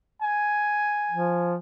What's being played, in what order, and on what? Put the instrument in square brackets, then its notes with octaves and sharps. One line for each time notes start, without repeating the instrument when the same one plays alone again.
[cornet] G#5
[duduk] F3